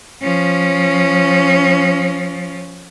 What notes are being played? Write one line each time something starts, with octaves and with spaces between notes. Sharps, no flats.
F3 C#4